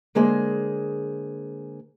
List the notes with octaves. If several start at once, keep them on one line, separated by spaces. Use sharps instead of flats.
D3 G#3 A#3 G#4 C5